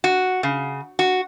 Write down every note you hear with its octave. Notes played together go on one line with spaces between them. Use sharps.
F#4
C#3
F#4